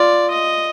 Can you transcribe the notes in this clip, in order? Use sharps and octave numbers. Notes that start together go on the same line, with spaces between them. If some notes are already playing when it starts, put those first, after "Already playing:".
Already playing: F4 D5
D#5